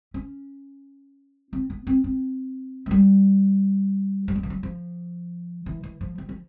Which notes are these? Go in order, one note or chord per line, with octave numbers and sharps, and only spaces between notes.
C#4
C4
B3
C4
C4
G#3
G3
G3
F#3
F3
F#3
F3
E3
E3
F3
F3
F3